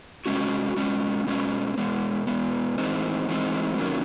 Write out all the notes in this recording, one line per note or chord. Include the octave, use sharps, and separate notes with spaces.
C3 D#3 G#3 C#4 F#4
B2 G#3 C#4
B2 G#3 C#4
B2 G#3 B3
B2 G#3 B3
A2 E3 G#3 C4 D#4
A2 E3 G#3 C4 D#4
C3 D#3 F#3 A#3 C#4